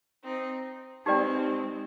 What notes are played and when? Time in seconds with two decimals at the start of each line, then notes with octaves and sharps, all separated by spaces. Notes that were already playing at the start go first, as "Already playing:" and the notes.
0.23 C4 D#4
1.05 G#3 C4 D#4 G4 B4 D5 G5